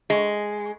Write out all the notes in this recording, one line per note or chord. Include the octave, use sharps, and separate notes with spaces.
G#3